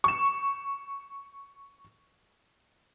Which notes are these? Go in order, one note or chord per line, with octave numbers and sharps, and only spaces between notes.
C#6 E7